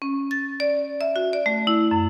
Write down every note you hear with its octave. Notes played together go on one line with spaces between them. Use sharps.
C#4
A6
D5
E5
F#4
D5
A3
E4
F#2